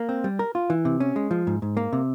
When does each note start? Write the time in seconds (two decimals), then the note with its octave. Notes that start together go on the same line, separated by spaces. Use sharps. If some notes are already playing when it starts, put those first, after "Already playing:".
Already playing: A#3
0.09 C4
0.24 G3
0.39 A#4
0.55 F4
0.70 E3
0.85 C3
1.00 C#4
1.16 G#3
1.31 F3
1.47 G#2
1.62 G#2
1.77 A#3
1.93 C3